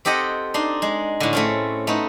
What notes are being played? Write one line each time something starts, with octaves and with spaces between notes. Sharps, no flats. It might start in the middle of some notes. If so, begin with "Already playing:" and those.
C4 G4 A4 D#5 F#5
D4 D#4 C6
G#3
A2 D3
A3 C4 C#4
A3 B3 D#4